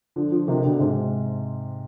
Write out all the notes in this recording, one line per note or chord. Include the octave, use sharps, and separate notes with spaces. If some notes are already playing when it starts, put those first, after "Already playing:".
D3 F3
D3 F3
C3 D#3
B2 D3
G#2 C3